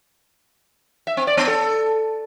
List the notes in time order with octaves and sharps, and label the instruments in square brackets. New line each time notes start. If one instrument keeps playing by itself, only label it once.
[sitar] E5
C4
D5
B3
A4